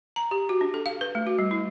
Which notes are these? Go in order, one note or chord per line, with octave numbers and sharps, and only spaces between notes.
A#5
G4
F#4
D4
A4
F5
B4
A3
F#4
G3
E4